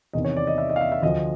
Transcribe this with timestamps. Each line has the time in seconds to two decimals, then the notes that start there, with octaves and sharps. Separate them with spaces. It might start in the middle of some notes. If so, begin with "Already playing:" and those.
0.13 E2 C3 D#3 D#5
0.25 C#5
0.37 D5
0.47 D#5
0.58 E5
0.70 D#5
0.76 F5
0.81 E5
0.92 E5
1.02 D2 D3 F3 D#5